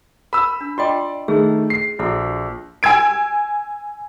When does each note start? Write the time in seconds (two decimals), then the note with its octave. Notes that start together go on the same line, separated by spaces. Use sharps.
0.33 A#4 A#5 B5 E6
0.61 D4
0.78 F4 D5 D#5 G5 C6
1.28 D#3 A3 G#4
1.70 C7
1.99 A#1 E4 F#4 A4
2.83 G#5 E6 G#6 D7